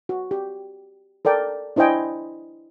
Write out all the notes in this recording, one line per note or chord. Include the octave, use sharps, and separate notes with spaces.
F#4
G4
A4 A#4 D5 G5
D4 E4 C5 D#5 G5 G#5